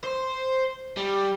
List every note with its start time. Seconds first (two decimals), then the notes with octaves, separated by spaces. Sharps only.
0.04 C5
0.97 G3